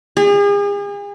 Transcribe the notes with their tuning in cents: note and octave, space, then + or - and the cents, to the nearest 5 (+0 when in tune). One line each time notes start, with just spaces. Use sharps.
G#4 -40